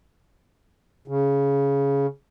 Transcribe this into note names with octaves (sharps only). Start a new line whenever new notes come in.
C#3